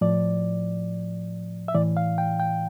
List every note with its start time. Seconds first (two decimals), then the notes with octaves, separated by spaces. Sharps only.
0.01 A2 F3 D5
1.68 E5
1.75 A2 E3 D5
1.97 F5
2.18 G5
2.40 G5